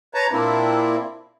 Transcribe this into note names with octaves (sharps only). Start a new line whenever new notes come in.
B4 C#5 A5 A#5
A#2 A#3 C4 D4 E4